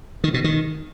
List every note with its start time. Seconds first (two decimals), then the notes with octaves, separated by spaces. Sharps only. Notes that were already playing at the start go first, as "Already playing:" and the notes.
0.24 D#3
0.34 B2
0.44 D#3